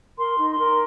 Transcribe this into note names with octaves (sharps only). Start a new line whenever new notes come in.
A#4 C6
D#4
C6
A#4